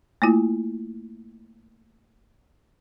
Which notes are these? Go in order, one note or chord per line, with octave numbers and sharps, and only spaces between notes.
A3 A#3 E4 F4